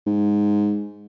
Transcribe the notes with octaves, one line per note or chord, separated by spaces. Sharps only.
G#2